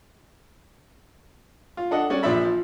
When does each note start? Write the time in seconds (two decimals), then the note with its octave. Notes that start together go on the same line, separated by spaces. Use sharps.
1.77 F4
1.91 D4 A4 D#5 F#5
2.10 G3 C#4 F#4 D5 F#5
2.23 A#1 F3 D5 E5 B5
2.45 F3